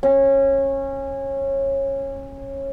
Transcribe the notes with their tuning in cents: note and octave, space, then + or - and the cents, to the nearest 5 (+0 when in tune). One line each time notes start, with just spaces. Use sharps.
C#4 -20